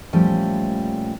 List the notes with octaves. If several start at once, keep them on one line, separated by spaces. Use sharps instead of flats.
A#2 F3 G3 A3 C#4 G5